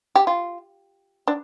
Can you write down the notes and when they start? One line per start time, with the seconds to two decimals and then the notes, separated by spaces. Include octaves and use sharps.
0.16 G4
0.27 F4
1.28 D4